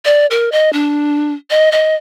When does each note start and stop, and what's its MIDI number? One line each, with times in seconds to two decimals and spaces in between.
0.05 0.26 74
0.31 0.49 70
0.52 0.72 75
0.73 1.33 62
1.50 1.70 75
1.72 1.95 75